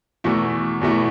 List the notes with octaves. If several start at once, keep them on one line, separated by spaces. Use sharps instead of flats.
E2 B2 A3 E4
E2 B2 A3 E4